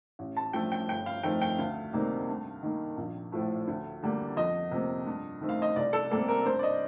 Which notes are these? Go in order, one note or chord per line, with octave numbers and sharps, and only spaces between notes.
A1
A5
G2 F3 A3 G5
G5
G1 G5
F5
F2 D#3 A3 C4 G5
G5
D2 F5
C3 D#3 G3 A#3
G2
D#3 A#3
A#1
A2 F3 A3
D2
D3 G3 A#3
F2 D#5
C3 F3 A#3
G2
D#3 A3 C4
F5
D#5
C2 D5
A4
C3 G3 A#3 A4
A#4
G2 C5
D5
D#5